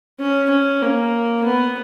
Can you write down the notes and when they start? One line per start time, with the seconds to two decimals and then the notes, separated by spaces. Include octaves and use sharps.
0.19 C#4
0.50 C#4
0.82 A#3
1.45 B3